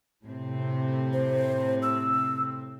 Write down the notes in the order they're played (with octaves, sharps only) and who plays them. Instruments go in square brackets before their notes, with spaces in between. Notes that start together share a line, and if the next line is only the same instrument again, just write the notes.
[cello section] A2 C3 C4
[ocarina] C5
E6